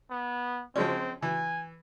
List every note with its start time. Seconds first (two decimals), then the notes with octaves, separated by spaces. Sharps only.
0.11 B3
0.76 F3 G#3 C4 C#4
1.22 E3 G#5